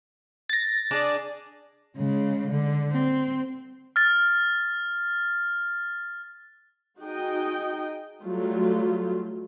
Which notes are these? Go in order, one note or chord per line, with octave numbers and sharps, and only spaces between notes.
A6 A#6
D4 G#4 D5
C#3 G#3
D3
C4
F6 A6
D#4 F#4 G#4 D#5 G5
F#3 G3 A3 F4